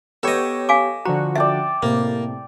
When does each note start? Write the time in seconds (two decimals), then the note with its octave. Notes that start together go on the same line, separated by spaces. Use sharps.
0.23 B3 G4 A4 C#5 D#5
0.69 F5 G#5 D6
1.05 D3 F3 F#4 A#5
1.35 D5 E5 G5 A5
1.83 A2 C3 A#3